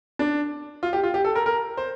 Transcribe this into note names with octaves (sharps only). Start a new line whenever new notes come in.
D4
F4
G4
F4
G4
A4
A#4
A#4
C5